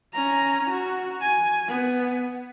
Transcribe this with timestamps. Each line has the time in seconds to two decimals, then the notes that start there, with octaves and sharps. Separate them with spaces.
0.13 C#4 A#5
0.70 F#4
1.22 G#5
1.67 B3